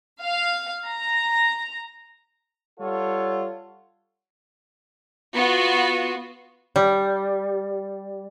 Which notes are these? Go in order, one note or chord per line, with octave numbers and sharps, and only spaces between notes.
F5
A#5
G3 F4 A4 C#5 F#5
B3 F4 F#4
G3